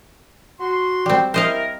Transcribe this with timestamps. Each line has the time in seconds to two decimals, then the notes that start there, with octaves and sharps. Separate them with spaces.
0.60 F#4 C6
1.06 G3 C4
1.34 E4 A#4 C5 D#5 F5